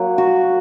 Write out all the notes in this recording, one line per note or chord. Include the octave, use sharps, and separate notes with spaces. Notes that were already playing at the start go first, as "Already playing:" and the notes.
Already playing: F#3 A#3
F#4